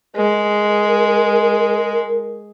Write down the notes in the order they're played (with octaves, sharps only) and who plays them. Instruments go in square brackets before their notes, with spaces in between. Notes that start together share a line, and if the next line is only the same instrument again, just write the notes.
[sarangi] G#3 [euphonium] A#4